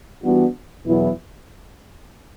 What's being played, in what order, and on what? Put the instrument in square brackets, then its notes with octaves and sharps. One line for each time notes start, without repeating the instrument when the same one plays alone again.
[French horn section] E3 G3 B3 D4 F#4
E2 B2 F#3 B3 E4